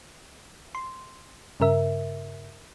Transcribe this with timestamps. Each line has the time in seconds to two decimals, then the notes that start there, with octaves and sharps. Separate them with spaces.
0.75 C6
1.60 G2 C#3 A#4 E5